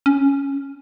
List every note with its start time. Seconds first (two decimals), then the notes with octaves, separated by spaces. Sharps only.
0.06 C#4